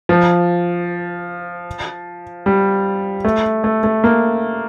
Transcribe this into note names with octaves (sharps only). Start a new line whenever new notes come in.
F3
G3
A3
A3
A3
A#3